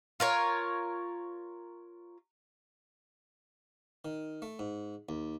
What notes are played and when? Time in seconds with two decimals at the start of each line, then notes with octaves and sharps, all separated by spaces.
0.20 F4 A#4 C#5
4.05 D#3
4.42 A3
4.59 G#2
5.09 D#2